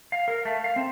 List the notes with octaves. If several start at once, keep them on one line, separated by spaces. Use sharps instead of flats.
F5
A#4
A3
F5
C4